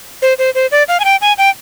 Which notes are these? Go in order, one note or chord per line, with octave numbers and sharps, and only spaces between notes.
C5
C5
C5
D5
F5
G#5
G5
G#5
G5